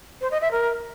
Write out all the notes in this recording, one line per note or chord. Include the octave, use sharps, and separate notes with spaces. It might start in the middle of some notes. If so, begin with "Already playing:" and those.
C5
D#5
E5
A#4